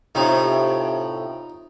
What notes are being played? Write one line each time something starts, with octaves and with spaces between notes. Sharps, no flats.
A2 C3 D#4 F4